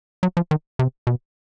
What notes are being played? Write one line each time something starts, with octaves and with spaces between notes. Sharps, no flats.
F#3
F3
D#3
C3
B2